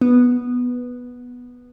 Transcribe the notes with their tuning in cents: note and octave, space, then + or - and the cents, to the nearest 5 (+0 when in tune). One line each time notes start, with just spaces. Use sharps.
B3 -5